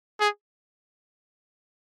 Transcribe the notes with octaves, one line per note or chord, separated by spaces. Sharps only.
G#4